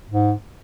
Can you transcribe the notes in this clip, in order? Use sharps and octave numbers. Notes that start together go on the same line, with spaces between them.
G#2